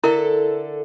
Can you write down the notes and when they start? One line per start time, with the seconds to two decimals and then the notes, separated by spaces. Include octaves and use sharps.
0.04 D3 E4 A4 A#4 E5